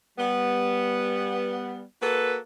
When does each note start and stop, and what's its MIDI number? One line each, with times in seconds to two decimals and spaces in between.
0.18 1.83 55
0.18 1.83 59
2.02 2.37 58
2.02 2.37 66
2.02 2.37 69
2.02 2.37 71